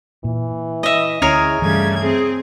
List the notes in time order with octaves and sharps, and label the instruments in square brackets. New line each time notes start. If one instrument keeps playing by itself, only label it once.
[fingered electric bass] A#2 [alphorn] E3
[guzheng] D#5 E5
[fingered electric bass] D2 C#4 [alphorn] E4 [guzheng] G#4 A#4 C#5
[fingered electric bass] G2 E3 [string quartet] C#3 G3 G#6 [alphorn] A3
[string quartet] C4 G#4